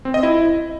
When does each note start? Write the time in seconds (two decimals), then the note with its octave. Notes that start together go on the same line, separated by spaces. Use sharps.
0.05 C4
0.14 D#5
0.23 E4